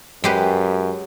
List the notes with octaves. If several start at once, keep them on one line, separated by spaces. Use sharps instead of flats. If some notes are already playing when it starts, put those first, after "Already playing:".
F#2 G#3 G4 B4